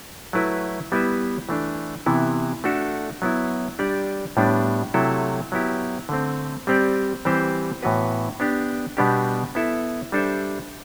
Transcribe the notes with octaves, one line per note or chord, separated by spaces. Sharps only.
F#3 A3 E4 B4
G3 B3 E4 B4 E5
E3 A3 D4
C3 E3 B3 E4
A3 D4 F#4 A4 E5
F#3 B3 E4
G3 D4 G4 D5
A2 G3 B3 D4
C3 F#3 A3 E4 A4
F#3 B3 E4 G4
D3 A3 C4
G3 C4 G4 D5
E3 G3 C4 G4 C5
A2 E3 B3 F#4 B4
B3 D4 G4
B2 G3 B3 D4 G4
B3 E4 A4 E5
G3 D4 A4 C5 E5